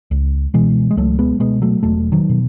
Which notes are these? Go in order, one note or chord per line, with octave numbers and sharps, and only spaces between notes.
C#2
B2 E3 G#3
G#3
C#2 F#3 A3
G#3 B3
B2 G#3 B3
F#3 A3
E1 F#3 A3
D#3 F#3
B2